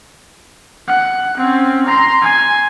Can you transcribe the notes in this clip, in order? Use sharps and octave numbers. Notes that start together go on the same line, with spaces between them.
F#5
C4 C#4
A#5 C6
G#5